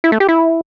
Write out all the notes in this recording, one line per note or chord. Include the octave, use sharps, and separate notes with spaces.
E4
A3
G4
E4